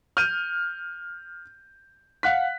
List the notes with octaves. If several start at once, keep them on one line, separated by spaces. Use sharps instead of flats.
F6 G6 D#7
F5 F#5 F#6 B6